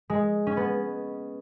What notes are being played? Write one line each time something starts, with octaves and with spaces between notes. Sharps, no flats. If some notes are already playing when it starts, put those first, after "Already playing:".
G#3
C#4
B3